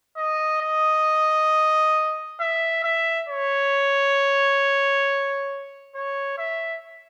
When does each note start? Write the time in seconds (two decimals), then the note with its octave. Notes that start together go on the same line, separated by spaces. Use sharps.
0.17 D#5
0.61 D#5
2.40 E5
2.84 E5
3.28 C#5
5.95 C#5
6.38 E5